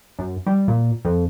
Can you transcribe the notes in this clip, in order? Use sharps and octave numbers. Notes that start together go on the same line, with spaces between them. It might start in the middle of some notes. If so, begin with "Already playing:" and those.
F#2
G3
A#2
F2